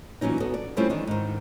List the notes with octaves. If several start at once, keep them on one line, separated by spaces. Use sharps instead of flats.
A#2 E3 F#3 C#4 D#4
B3 F#4 A4 D#5
D5
G3 A3 C4 C#4 E4 F4
D#3 E3 D4
G#2 D#3